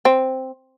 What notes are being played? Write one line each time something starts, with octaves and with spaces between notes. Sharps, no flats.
C4